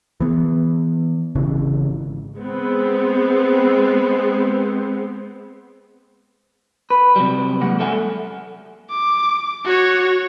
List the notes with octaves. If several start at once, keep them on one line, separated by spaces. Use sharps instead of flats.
E3 B3
G#1 C#3 E3
G#3 B3 C4
B4
C3 F#3 G3
E3 G#3 A#3 F#5
F#2 A4 E5 F#5 G#5
D6
F#4 C#5